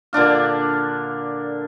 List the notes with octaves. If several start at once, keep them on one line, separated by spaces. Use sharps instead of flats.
A#2 D3 D4 F5